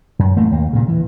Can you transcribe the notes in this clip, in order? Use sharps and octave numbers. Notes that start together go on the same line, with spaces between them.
F#2
A1 A3 A#3
D#2 A#3
G2 A#2 C#3
E3